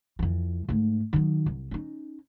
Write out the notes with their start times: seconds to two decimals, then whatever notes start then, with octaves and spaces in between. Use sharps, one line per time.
0.19 F2 E3
0.69 G#2 A3
1.13 D#3 F#3
1.46 C2
1.71 C#4 D#4